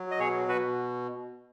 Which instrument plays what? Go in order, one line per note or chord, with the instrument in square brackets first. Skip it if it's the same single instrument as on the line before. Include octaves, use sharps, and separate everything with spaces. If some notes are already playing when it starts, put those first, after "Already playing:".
Already playing: [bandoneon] F#3
D#5
B2 G#4 C#5
B2 F#4 B4